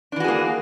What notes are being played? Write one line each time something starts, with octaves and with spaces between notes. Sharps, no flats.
E3 A#3 D4 F#4 G#4